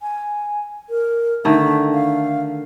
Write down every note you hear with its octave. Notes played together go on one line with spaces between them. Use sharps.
G#5
A#4
D3 D#3 A3 E5
F5